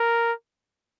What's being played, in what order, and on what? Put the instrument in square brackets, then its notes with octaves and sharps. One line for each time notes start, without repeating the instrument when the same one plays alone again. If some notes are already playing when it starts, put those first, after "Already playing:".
Already playing: [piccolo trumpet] A#4